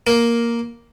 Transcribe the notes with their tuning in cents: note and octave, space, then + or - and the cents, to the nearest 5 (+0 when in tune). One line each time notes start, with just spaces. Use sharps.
A#3 +5